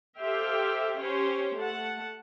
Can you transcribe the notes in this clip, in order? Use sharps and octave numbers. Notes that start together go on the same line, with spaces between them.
G4 A4 C5 E5 F5 G5
C#4 G4 C5 C#5
A3 F#5 A5